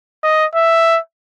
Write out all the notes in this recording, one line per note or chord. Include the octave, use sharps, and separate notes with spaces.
D#5
E5